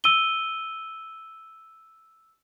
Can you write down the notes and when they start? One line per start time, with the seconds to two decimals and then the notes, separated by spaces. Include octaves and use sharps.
0.04 E6 D#7 G7